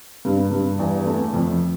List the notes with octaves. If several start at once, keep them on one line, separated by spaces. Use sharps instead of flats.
G2
G2
E2
A3
F2